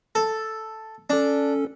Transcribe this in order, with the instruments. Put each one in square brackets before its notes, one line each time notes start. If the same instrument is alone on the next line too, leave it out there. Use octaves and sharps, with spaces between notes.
[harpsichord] A4
[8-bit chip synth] C#4 A4 [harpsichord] D4